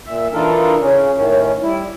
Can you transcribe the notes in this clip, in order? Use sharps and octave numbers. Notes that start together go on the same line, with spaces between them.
A#2 E5
E3 D4 D#4 F4 A4 A#4
C#3 C#4
A2 D#3 C#4
G3 E4